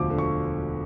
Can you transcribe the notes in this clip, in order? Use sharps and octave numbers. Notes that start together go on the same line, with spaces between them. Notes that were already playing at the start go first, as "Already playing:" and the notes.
Already playing: E1 D2 D3 F3 D6
D3
C#6